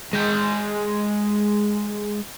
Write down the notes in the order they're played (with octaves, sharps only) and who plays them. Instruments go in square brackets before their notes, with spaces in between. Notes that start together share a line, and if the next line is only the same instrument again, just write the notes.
[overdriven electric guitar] G#3 G5